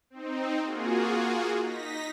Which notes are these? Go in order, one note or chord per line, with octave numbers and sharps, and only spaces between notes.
C4 D#4
A#3 F4 F#4 G#4
D#4 A#6 B6